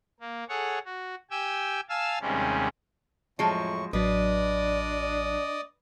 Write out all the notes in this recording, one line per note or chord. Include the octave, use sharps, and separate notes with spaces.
A#3
G#4 A4 C#5 F#5
F#4
G4 G5 G#5 E6
F5 G#5 A5 E6 F6
D#2 C3 G3 G#3 C#4
F2 A2 F3 F#3 G#3 C#6
A1 F#3 D4 B4 D5 D#5 D#6